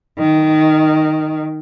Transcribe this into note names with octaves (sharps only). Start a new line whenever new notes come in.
D#3